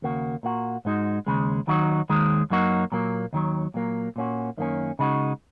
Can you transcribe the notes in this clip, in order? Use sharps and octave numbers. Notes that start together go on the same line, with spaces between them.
D#2 C#3 A#3 F#4
A#2 A#3 F#4
G#2 G#3 D#4 F#4
D#2 C#3 G#3
D#2 D#3 F#3 D#4 F#4
D#2 D#3 G#3
F#2 F#3 A#3 D#4 F#4
A#2 F#3 A#3
D#2 D#3 F#3
A#2 F#3 A#3
A#2 A#3 C#4 F#4
F#2 D#3 A#3 C#4
C#3 G#3 D#4 F#4